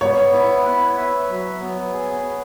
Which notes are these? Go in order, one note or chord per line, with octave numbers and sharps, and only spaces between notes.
B3 C#5
E4
B4
E5
F#3
B3
G#4
B4